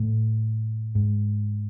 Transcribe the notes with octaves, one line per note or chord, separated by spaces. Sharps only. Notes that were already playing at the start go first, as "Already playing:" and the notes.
Already playing: A2
G#2